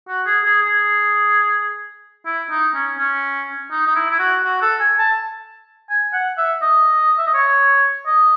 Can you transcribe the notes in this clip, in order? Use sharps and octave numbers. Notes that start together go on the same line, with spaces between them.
F#4
G#4
G#4
G#4
E4
D#4
C#4
C#4
D#4
D#4
E4
E4
F#4
F#4
A4
G#5
A5
G#5
F#5
E5
D#5
E5
D#5
C#5
D#5